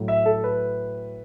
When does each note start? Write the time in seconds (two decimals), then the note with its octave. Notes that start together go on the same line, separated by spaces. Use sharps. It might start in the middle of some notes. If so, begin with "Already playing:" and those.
Already playing: A2 F#3 A3
0.08 E5
0.26 A4
0.44 B4